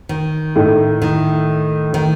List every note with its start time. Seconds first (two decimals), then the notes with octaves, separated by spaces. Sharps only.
0.09 D#3
0.56 A2 A3 D#4
1.02 D#3
1.94 D#3